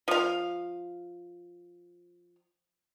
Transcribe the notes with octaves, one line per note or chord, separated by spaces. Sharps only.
F3 F5